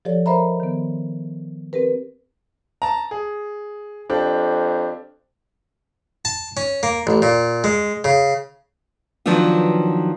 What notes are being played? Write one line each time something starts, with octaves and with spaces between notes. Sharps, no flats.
F3 G4 A4 C#5 D5
A#4 C5 D#5 E5 A#5 B5
D#3 B3
C4 G4 A#4 B4
A5 A#5
G#4
F2 D4 G4
A5
C#4
A#3
A1
A#2
G#3
C#3
D#3 F3 F#3 B3 D4 F4